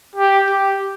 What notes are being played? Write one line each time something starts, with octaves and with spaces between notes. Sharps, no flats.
G4
G4